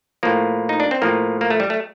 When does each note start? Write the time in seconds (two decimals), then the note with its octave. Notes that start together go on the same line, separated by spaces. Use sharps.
0.23 A2 F3 A#3
0.69 D#4
0.80 D4
0.91 C4
1.02 A2 F3 A#3
1.41 A#3
1.50 A3
1.60 G3
1.70 A3